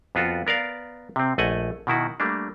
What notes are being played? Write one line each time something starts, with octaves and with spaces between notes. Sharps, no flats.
F2 B3 F4 F#4 A4
B3 A#4 D5 F5
C3 C4
A#1 A3 D#5 F#5 G#5
B2 D#3 E4 F#4
G3 A3 A#3 D4